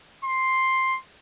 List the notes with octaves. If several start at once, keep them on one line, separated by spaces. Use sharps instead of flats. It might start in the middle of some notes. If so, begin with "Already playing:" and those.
C6